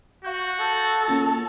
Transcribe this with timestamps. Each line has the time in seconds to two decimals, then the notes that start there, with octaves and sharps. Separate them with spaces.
0.24 F#4 F5 C#6 G6
0.59 A4
1.08 A#3 C#4 F4